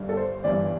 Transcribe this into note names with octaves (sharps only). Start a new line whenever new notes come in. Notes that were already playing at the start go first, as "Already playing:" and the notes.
Already playing: G1 G2 D3
A4
C5
G1 G2 E3 D5